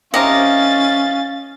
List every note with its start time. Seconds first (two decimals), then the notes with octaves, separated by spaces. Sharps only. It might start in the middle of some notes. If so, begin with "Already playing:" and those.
0.14 C3 C#4 G4 A#4 D#5 F5 A6